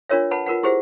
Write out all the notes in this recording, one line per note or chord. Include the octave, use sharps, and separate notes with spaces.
D4 F4 A#4 C#5 E5
B4 F#5 A5 B5
F4 A#4 B4 F#5
E4 G4 G#4 C5 E5 F#5